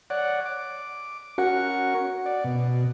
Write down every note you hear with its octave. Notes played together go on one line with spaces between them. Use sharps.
C#5 D5 F#5
D6
C#4 F#4 A#4 F#5 C#6
D5
B2